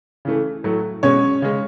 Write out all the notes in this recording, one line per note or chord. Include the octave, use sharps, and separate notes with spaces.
C#3 E3 A3
A2 F#3 A3
B2 G#3 C#4 C#5
C#3 G#3